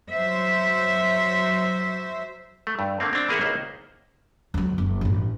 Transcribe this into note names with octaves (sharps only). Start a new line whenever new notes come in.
F#3 C5 E5
A3
G2
D3 A3 A#3 C4
C4 D4
E3 A#3 G#4 A#4 E5 F#5
C#2 A#3 D#4 C5
C#2 F#3
F#1
A1 G2